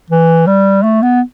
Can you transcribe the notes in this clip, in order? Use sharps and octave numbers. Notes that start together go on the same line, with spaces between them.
E3
G3
A3
B3